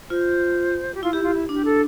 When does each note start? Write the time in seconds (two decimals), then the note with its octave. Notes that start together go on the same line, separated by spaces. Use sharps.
0.10 F4 C5
0.94 G4
1.03 E4 F4
1.13 E4 G4
1.23 F4
1.34 E4
1.49 D4 G4
1.65 A4